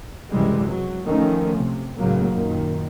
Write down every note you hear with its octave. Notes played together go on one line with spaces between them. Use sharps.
C#2 F#2 C3 E3 G3 G#3
F#3
D#3 F3 A3 C#4
C3
C#2 A2 C#3 F#3 A#3
F#2 A#2 D#3